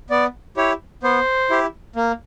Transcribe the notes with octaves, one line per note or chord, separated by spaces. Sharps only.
B3 D5
E4 G4 C#5
B3 C5
E4 G4
A#3